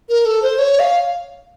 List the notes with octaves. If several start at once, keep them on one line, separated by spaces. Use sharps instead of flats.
A#4
A4
C5
C#5
F5